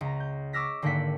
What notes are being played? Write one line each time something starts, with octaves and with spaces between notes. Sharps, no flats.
C#2 A#5
G6
C#6 D6 E6 F6 A#6 B6
G#1 D3 A#3 G4 F#5 B6